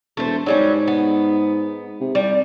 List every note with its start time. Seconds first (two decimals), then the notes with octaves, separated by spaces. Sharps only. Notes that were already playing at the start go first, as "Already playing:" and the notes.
0.17 E1 A3 C5
0.46 G#2 F#3 G3 C#4
0.88 B3
2.00 C3
2.15 C2 G3